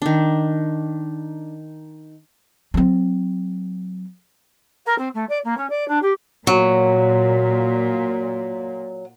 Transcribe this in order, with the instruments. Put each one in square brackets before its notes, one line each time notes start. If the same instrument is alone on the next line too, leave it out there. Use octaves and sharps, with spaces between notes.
[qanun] D#3 D4
[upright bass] F#3 C4
[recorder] A#4
C4
A3
D5
A#3
C#4
D5
D4
G4
[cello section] A#2 [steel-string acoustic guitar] F#3